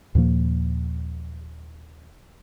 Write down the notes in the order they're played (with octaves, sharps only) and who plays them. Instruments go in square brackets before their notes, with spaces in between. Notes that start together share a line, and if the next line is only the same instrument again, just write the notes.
[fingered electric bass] D#2 A#2 F3 A#3